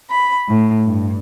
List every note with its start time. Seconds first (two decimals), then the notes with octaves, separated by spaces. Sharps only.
0.10 B5
0.49 A2
0.86 G2